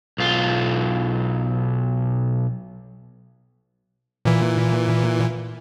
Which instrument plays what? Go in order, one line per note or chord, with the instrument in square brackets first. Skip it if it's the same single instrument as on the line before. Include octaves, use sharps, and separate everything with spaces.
[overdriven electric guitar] B1 F4
[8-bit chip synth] A#2 E3